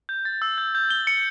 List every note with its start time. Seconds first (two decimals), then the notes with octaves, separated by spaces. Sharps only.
0.09 G6
0.25 A6
0.42 E6
0.58 G6
0.75 G6
0.90 G7
1.07 C#7